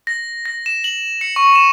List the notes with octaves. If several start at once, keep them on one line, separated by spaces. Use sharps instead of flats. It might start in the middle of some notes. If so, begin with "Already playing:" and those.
A#6
A#6
E7
F#7
C#7
C#6
E7